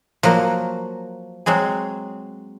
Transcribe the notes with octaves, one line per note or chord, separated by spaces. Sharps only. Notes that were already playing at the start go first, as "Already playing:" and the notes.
F3 F#3 A#3 F#4
F#3 G#3 C4 G#4